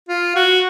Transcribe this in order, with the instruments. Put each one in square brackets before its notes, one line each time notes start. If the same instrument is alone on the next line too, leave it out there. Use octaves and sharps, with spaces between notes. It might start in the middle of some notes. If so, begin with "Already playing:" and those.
[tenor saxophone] F4
F#4